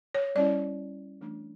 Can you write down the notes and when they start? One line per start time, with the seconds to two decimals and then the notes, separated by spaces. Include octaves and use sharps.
0.15 C#5
0.35 G3 C#4 E4 D5
1.21 E3 A3 D4